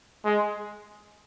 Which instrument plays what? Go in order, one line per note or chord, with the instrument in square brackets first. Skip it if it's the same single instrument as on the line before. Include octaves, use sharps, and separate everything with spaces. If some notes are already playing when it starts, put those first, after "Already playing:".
[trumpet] G#3